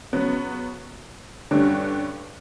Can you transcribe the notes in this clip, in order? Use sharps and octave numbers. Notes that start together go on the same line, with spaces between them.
C#3 F#3 B3
G2 D3 G3 C#4